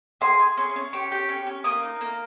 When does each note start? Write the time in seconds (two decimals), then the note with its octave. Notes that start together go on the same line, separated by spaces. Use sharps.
0.21 G#4 C6
0.39 G#4
0.57 C#4
0.76 C#4
0.93 G4 C#6
1.12 G4
1.29 C#4
1.47 C#4
1.64 A#3 D#6
1.83 D#4
2.01 A#3